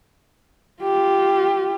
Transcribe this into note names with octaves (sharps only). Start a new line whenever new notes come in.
F4 G4